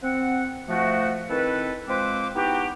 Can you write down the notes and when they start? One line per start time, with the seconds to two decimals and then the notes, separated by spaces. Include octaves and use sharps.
0.03 C4 F#5
0.68 F3 A3 F#4
1.29 D#3 C4 E4 A4 B4
1.88 F3 G#3 C4 B4 C5 D6
2.35 B3 D#4 E4 F#4 G4